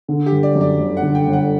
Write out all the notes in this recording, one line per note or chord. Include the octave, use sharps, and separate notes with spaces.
D3
G4
G1
D5
F#2
D5
G1
F#5
D3
G5
G1
F#5